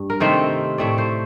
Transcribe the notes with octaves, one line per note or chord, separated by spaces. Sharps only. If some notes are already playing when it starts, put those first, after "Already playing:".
Already playing: G2
A#4
C3 D#3 A3 C4 C5
A2 A3 C4 D5
C5